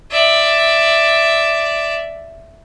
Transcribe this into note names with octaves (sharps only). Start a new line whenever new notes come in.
D5 E5